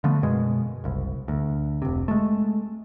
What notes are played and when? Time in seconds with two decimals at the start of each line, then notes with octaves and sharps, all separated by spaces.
0.04 D3 F3 A3 B3
0.22 F#2 B2 G#3
0.84 F#1 C2
1.28 D2
1.82 F1 C3
2.08 G#3 A3